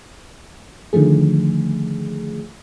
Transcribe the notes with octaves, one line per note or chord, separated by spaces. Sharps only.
D3 D#3 F3 A3 G#4